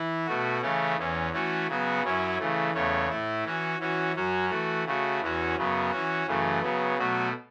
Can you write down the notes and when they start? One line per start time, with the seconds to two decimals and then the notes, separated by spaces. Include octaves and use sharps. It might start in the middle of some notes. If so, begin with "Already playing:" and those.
Already playing: E3 E4
0.26 B2 A3 F#4
0.62 C#3 E3 A3 C#4
0.97 E2 E3 C#4
1.32 E3 A3 C#4 F#4
1.67 C#3 F#3 B3 F#4
2.03 F#2 F#3 C#4 E4
2.39 C#3 E3 A3
2.74 E2 C#3 A3 C#4
3.09 A2 A3 E4
3.44 E3 C#4 F#4
3.79 E3 C#4 F#4
4.15 F#2 F#3 C#4 F#4
4.50 E3 A3 F#4
4.85 C#3 A3 F#4
5.20 E2 E3 C#4 F#4
5.56 F#2 C#3 F#3 B3
5.91 E3 C#4 F#4
6.26 F#2 C#3 E3 A3
6.62 C#3 F#3 B3
6.98 B2 F#3 A3 F#4